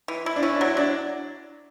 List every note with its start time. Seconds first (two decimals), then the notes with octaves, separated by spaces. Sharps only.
0.08 E3
0.26 E4
0.36 D4
0.43 C#4 E4
0.55 D4
0.61 F#3 E4
0.77 F#3 D4